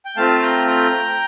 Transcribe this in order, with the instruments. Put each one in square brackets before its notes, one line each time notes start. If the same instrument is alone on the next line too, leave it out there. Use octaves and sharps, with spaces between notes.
[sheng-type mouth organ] G5
A3 C4 F4 F5 A5
G5 A#5
G5 A#5